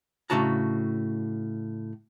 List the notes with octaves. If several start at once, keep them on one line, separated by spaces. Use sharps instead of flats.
A2 C#3 D4 F#4 A5 A#5